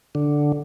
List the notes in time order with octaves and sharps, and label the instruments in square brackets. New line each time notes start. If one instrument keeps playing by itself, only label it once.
[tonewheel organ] D3